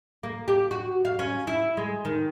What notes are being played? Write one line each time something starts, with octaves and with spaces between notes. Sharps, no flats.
A#3
G4
F#4
F5
C#4
E4
G#3
D#3